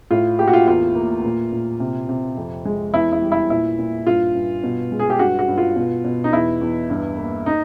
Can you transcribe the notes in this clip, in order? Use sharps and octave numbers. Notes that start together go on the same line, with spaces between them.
A2 F4
A#3 G4
F#4
F4
E2 F4
A#3
A#2
A#2
C3
C3
F2
G#3
E2 E4
E4
G3
E4
A#2 E4
A#2
G2 F4
G2
B2
G#3
G#4
G4
G2 F#4
F#4
G2
F4
B2
B2
D#4
E2 E4
E2
G2
A#3
D#4